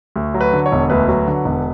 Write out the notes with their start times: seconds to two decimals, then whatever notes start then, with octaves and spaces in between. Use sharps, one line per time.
0.16 D2
0.34 F#3
0.41 B4
0.53 D3
0.66 C#5
0.72 E1
0.90 D2 B4
1.08 F#3
1.28 D3
1.45 E1